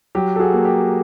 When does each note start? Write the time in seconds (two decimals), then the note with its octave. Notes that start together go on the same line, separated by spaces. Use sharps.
0.15 F#3 G4
0.36 A4
0.39 F#4 G#4
0.53 A#3
0.65 G4 A4